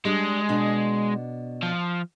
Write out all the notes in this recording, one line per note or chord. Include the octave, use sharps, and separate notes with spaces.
G3 G#3 D4
B2 D4
F3